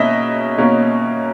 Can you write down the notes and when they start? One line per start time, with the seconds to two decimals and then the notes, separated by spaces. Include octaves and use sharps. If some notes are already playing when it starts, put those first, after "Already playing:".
Already playing: B2 A#3 C#4 D#5 E5
0.58 B2 A#3 C#4